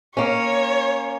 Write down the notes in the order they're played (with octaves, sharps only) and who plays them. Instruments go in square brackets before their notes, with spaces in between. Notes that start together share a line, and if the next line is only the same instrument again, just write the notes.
[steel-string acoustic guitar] A#3 C#4 [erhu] C#5